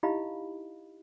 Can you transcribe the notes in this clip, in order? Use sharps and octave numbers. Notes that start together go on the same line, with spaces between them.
D#4 E4 G4 D#5 F5 B5